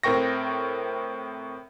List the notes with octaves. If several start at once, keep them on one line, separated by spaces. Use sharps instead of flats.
A2 C4 A#4 G5 C#6 A#6